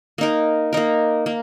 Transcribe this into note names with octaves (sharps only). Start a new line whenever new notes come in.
A#3 D#4 A#4
A#3 D#4 A#4
A#3